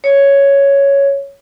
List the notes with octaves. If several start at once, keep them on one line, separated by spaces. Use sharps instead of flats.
C#5